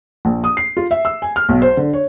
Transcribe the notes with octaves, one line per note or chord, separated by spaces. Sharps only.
A#1
D#6
C7
F4
E5
E6
G#5
F6
B1
C5
D3
C#5